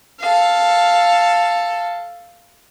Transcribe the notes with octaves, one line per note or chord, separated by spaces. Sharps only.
A4 F5